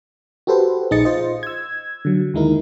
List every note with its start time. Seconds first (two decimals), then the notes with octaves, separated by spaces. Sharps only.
0.47 F#4 G4 A4 B4 C5
0.91 A#1 D#4 G#4 D#5 A6 C#7
1.05 F4 C5 D#5
1.43 E6 G#6
2.05 D3 F#3
2.34 D#2 G#3 D#4 E4 A#4